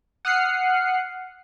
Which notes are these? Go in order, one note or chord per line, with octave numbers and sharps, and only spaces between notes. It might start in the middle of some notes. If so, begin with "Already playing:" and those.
F#5 D#6 F6 F#6 C7 C#7